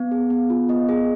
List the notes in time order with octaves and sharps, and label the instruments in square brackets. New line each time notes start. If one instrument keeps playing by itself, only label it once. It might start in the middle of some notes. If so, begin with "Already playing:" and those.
Already playing: [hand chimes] B3
G#4
B3
F4
B3 D#5
G#4